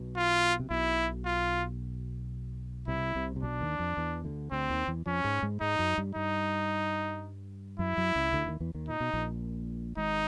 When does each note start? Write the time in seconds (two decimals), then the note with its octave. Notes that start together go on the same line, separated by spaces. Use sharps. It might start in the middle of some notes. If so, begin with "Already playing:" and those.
Already playing: B1 B2
0.16 F4
0.60 C3
0.70 B1 B2 E4
1.25 F4
2.88 C2 C3 E4
3.15 C2 C3
3.36 C3
3.43 B1 B2 D4
3.61 D#2 D#3
3.79 F2 F3
3.97 E2 E3
4.24 D2 D3
4.51 D2 D3 C4
4.70 D#2 D#3
4.88 E2 E3
5.06 F2 F3 C#4
5.24 G#2 G#3
5.43 G#2 G#3
5.61 G#2 G#3 D#4
5.79 F#2 F#3
5.98 G2 G3
6.15 G2 G3 D#4
7.79 F#2 F#3 E4
7.97 F#2 F#3
8.15 C#2 C#3
8.33 D2 D3
8.47 D#2 D#3
8.60 E2 E3
8.75 D#2 D#3
8.88 A#2 D#4
9.00 B2
9.13 A#1 A#2
9.97 G#1 G#2 D#4